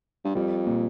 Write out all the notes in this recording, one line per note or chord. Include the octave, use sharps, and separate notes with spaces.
G2
F2 G3
A#2